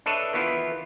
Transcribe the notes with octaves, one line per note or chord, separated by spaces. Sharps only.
D4 A4 B4 C#5 D#5 E5
D#3 E3 B3 E4 F4